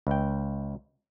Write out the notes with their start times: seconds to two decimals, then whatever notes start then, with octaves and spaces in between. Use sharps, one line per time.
0.07 C#2 G5